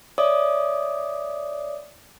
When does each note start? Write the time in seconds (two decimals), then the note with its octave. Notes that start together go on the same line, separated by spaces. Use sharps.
0.18 C#5 D5 E5 D6 D#6